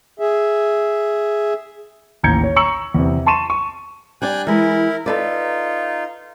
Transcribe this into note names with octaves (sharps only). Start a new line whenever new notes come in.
G#4 E5
A1 D#2 A#5 G6 G#6 C#7
C#5
A#5 C#6 E6 C#7 F#7
E2 C3
A5 C6 C#6 D#7 E7
C#6
G3 D4 D5 G5 G#5 F#6
E3 G#3 E4 A#4
D#4 F4 A4 B4 D5